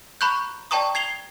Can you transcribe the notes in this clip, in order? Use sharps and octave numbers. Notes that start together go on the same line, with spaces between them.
A#5 B5 C#6 F#6 G6
D5 G5 A5 A#5 C#6 D#6
G#6 C7 F7 G7